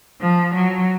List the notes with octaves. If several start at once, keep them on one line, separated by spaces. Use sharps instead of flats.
F3
F#3